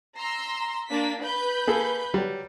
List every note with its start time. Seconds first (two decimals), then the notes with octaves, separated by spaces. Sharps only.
0.16 A#5 C6 E6
0.89 A#3 D4 B6
1.22 B4 B5 G6
1.67 A#3 G#4 A4
2.14 F#3 G3